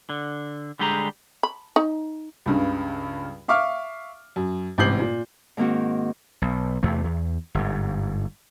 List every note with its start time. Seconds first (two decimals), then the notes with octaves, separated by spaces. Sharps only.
0.10 D3
0.79 D3 G3 G#3 G4 G#4 A#5
1.43 B5
1.76 D#4
2.46 C#2 G2 C#3
3.48 E5 F5 C#6 D6 F6
4.36 F#2
4.78 A1 G#2 C3 G6 C7 F#7
5.00 A#2
5.57 G#2 D#3 A#3 C4 F#4
6.42 B1
6.83 E2 C3 A3
7.04 E2
7.55 G1 G#2